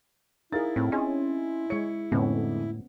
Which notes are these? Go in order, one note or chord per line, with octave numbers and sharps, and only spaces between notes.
D#4 E4 G#4 A#4 F5 A6
A2 C4
C#4 D4 G#4 D#5 G#5 C6
G#3 C#5 C#7
F2 A2 D3 G#3 B3 C#4